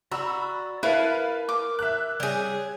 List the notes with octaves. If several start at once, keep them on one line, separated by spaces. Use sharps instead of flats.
F#4 D5 A#5 B5 E6
E4 A#4 B4 F5 A5
D6
E5 F#6
G3 G#4 C#5